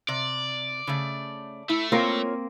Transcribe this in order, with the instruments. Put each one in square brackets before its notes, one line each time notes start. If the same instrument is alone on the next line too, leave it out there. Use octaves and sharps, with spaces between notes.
[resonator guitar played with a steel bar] C3 [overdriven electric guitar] D5
[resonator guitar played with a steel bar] C#3 A3
[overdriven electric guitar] A3 [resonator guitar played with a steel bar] E4
[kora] A#3 C4 [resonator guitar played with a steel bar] F4 A#4 C#5